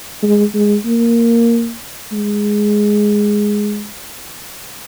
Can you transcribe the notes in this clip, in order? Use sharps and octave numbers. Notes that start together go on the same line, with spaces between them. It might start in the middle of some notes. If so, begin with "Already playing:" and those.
G#3
G#3
A#3
G#3